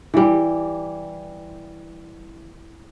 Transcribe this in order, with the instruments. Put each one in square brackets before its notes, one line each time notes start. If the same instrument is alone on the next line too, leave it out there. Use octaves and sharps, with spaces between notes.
[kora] E3 G3